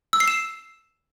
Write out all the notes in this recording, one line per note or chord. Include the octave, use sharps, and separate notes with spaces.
E6
C7
E7